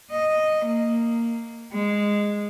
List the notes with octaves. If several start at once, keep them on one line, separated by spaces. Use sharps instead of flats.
D#5
A#3
G#3